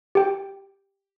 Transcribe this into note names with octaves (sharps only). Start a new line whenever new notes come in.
G4 G5